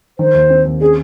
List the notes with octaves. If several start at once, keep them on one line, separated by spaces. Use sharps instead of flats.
D#3 C5
D#2
C4
D#2
C#4 G#4